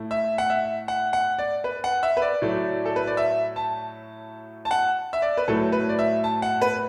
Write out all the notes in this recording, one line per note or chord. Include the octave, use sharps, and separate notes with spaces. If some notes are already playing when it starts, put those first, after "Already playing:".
Already playing: A2 A3 E4
E5
F#5
E5
F#5
F#5
D5
B4
F#5
E5
B4
D5
A2 F#3 A3
A4
B4
D5
E5
A5
A5
F#5
E5
D5
B4
A2 F#3 A3 A4
B4
D5
E5
A5
F#5
B4